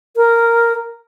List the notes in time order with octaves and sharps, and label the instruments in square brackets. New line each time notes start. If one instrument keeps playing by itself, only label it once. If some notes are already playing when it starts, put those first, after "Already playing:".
[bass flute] A#4